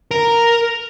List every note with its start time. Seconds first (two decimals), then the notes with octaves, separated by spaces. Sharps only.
0.11 A#4